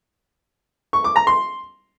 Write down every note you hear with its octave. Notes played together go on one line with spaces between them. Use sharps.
C#6
D6
A#5
C6